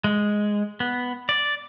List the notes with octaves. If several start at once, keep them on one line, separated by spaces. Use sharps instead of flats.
G#3
B3
D5